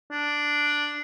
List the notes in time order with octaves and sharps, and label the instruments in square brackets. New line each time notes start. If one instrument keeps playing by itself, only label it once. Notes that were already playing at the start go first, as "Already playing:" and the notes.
[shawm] D4